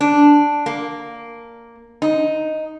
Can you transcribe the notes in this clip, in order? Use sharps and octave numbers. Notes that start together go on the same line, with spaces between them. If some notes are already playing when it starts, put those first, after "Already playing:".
D4
A#3
D#4